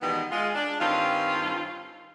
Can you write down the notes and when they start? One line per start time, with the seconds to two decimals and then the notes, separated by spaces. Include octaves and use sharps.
0.02 B2 D#3 E3 G3 G#3 B3
0.31 G#3 F4
0.55 D4
0.81 G2 D#3 C4 C#4 F4